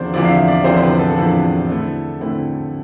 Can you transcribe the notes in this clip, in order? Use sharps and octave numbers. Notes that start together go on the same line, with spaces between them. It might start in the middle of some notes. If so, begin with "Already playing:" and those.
Already playing: E2 D3 F3 C4 E4 C5 D5
E2 D3 F3 C4 E4 D5
F5
E5
D5
E2 D3 F3 C4 E4 C5
C5
B4
A4
E2 D3 F3 C4 E4 A4
D3 A3 C4 E4
D3 A3 C4 E4